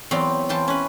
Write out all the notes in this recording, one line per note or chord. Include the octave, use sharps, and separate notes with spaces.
E2 F#3 C4 D5 F5 G5
E3 F4 G5 A5
C#4 B4